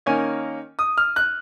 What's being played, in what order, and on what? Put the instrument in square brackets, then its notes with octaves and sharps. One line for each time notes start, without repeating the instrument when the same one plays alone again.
[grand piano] D#3 A#3 C#4 G#5
D#6
F6
F#6